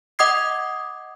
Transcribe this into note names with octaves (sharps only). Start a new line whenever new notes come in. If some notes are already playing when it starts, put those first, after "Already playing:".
D#5 F#5 D6 D#6 G#6 C7